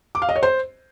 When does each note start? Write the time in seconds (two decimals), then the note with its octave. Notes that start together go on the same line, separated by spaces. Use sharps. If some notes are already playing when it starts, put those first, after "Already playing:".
0.15 D6
0.22 F5
0.29 D#5
0.36 C#5
0.43 C5